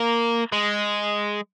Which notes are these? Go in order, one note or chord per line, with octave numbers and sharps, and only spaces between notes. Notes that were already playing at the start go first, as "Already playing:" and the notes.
Already playing: A#3
G#3